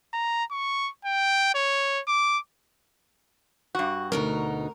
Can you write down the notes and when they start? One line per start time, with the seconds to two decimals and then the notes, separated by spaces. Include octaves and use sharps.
0.14 A#5
0.51 C#6
1.05 G5
1.55 C#5
2.08 D6
3.75 G2 F#4
4.12 D2 B2 D#4 A#4